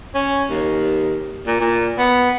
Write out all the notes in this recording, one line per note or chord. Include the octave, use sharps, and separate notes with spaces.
C#4
D#2
A#2
A#2
B3